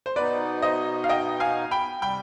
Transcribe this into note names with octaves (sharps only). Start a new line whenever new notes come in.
C5
B2 B3 D#4 B4 D5
C5 D#5
F5
D#5 G5
F5 G#5
G5 B5
C3 G3 G5 B5